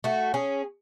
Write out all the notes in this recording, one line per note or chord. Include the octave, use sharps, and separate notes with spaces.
A3 F#4
C#4 G#4